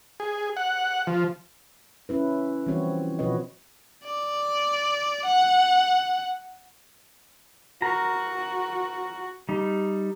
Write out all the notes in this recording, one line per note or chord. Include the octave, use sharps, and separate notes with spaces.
G#4
F#5
F3
C#4 E4 B4
E3 F3 G3 C4 F#4 C#5
B2 F3 F#4 B4 C#5 D#5
D5
F#5
F#4 A#4 A#5
G3 D#4